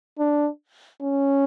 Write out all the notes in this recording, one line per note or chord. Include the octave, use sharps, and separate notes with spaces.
D4
C#4